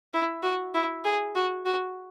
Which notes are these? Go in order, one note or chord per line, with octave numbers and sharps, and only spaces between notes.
E4
F#4
E4
G#4
F#4
F#4